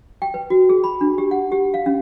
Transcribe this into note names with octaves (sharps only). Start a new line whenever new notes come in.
G5
B4
F#4
G#4
B5
D4
G4
F#5
G4
F5
C#4